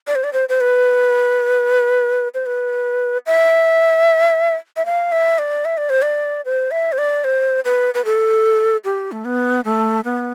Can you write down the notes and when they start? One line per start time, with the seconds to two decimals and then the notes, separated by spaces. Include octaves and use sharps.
0.07 D5
0.15 C5
0.24 D5
0.33 C5
0.49 C5
0.61 B4
2.35 C5
2.46 B4
3.26 E5
4.77 E5
4.86 F5
5.12 E5
5.38 D5
5.65 E5
5.77 D5
5.90 C5
6.02 D5
6.45 C5
6.71 E5
6.92 C5
6.98 D5
7.24 C5
7.65 B4
7.94 B4
8.05 A4
8.85 G4
9.12 A3
9.25 B3
9.65 A3
10.05 B3